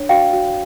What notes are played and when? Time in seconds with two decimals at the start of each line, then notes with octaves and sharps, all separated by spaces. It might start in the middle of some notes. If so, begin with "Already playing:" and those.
Already playing: D4 C#5
0.09 F#4 F5 G5
0.33 F#4